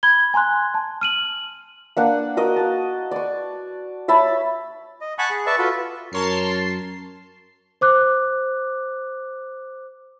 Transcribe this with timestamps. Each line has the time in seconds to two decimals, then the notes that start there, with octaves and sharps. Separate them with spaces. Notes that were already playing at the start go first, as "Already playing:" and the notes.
0.03 B5 G#6 G7
0.34 G#5 A#5 C6 F#6
0.74 A5
1.01 F6 D#7 F#7
1.97 A#3 D4 F#5
2.37 F#4 A#4 D#5
2.56 A5
3.11 D5 C#6
4.08 C#5 E5 A5 B5
5.01 D#5
5.18 F#5 G#5 A5 B5 C#6 F#6
5.30 G#4
5.46 B4 D5 E5 A5 C#6
5.58 F4 F#4 A4 B4
6.13 F#2 A#4 C#5 A5 C6 C7
7.81 C5 D6 F#6